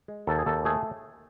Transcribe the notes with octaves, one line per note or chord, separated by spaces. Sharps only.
G#3
D#2 A4
G#4
D#2 A4
A3 G#4